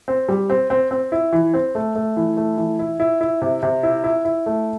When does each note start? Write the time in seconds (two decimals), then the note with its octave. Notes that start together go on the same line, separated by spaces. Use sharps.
0.08 C4
0.29 G3
0.50 C4
0.70 C4
0.91 C4
1.12 E4
1.33 E3
1.54 C4
1.75 A3
1.96 A3
2.17 E3
2.37 A3
2.57 E3
2.79 E4
3.00 E4
3.21 E4
3.42 C3
3.63 C3
3.83 E4
4.04 E4
4.25 E4
4.46 A3